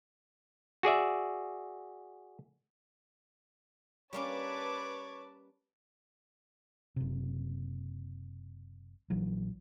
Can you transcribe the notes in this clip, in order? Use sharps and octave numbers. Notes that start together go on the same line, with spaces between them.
F#4 G#4 D5 E5
G3 A#3 C#4 B4 C#5 A5 D6
F#1 C3
A#1 E3 F#3